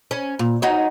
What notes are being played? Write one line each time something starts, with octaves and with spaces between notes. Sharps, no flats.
C#4
A#2
D#4 F#4 C#5